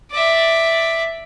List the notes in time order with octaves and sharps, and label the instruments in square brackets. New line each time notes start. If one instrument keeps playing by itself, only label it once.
[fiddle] D5 E5